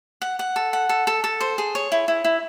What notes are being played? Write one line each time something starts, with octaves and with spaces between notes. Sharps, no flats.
F#5
F#5
A4
F#5
A4
A4
A4
C5
G#4
C#5
E4
E4
E4